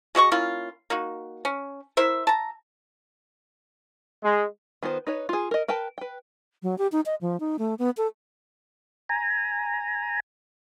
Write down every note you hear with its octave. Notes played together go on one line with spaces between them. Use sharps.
G#3 F#4 D#5 C#6
A#3 C#4 E4 F4
A#3 D#4 F#4
C#4
E4 A#4 C5 E5
A5 A#5
G#3
D#3 B3 F4 C5
D#4 B4 C#5
F4 G#4
A#4 D#5
A#4 B4 G5 A5
B4 G5
F#3
G4
D#4
D#5
F3
D#4
A3
B3
A4
G#5 A#5